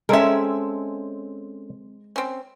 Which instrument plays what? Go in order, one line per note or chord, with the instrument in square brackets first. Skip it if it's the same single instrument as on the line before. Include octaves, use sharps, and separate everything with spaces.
[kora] G#3 C4 [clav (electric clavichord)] C#4 A4 [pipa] A#4 E5
[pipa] C4 C#4